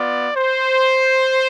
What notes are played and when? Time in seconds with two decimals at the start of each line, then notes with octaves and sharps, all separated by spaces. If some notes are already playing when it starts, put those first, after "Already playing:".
Already playing: B3 F4 D5
0.36 C5